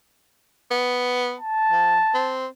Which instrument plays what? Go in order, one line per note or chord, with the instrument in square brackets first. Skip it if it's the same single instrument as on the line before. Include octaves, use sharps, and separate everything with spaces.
[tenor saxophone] B3
[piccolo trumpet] A5
[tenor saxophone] F3
C4